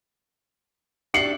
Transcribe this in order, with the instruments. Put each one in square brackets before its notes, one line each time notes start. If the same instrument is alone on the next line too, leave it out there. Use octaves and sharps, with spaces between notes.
[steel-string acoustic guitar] D4 G4 E5 [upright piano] C7 C#7 F#7